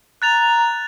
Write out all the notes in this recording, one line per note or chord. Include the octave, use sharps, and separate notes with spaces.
A#5 F#6 A6 F7